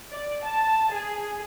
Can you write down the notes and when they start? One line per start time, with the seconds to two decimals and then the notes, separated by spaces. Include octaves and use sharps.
0.12 D5
0.45 A5
0.92 G#4